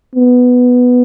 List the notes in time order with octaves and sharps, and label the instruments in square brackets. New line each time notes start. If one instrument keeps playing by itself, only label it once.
[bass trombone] B3